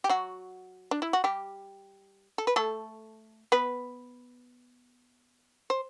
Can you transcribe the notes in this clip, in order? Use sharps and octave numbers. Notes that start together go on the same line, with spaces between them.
G4
F#3 F#4
D4
E4
F#4
G3 G4
A4
B4
A3 A4
B3 B4
C5